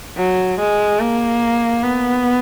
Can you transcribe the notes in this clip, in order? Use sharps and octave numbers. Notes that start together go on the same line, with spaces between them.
F#3
G#3
A#3
B3